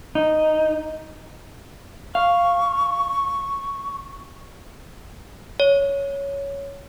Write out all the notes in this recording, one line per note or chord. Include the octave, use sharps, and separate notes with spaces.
D#4
F5 C#6
C#5